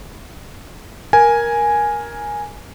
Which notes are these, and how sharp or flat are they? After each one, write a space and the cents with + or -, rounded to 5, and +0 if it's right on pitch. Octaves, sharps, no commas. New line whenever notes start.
A#4 +10 G#5 +0